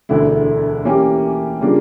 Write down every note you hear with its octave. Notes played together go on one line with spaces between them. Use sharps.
E1 D2 D3 A3 E4
E3 A#3 C#4 G4
C#3 G3 A#3 D4 F4